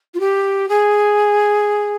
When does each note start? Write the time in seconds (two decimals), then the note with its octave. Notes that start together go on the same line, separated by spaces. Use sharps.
0.14 F4
0.20 G4
0.69 G#4